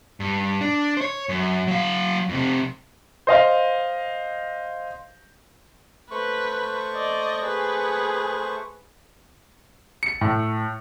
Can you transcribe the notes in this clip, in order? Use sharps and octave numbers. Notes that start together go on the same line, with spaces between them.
G2
D4
C5 C#5
F#2
F#3 F5
F2 C3
C5 D#5 F5
A3 B4 C5 C#6
D5 D#5
G#4 B4
C#7
A2